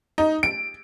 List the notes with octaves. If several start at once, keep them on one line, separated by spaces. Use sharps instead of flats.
D#4
D7